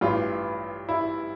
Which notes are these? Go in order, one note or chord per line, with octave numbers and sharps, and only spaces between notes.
A1 G2 E3 F4
E4